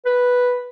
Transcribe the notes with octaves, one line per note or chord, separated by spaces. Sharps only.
B4